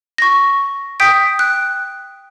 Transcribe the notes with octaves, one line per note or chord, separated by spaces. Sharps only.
C#6 A#6
G5 D#6 G6 B6 D7
F#6